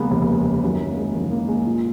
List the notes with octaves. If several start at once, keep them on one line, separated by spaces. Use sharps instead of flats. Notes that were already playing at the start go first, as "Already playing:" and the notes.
Already playing: F1 D#2 C#3 G#3 A#3 B3
F1 D#2 C#3
F#1 F#2 D#3 C#4
A#3
G#3
F#1 F#2 D#3 A#3
A#3
G#3
A#2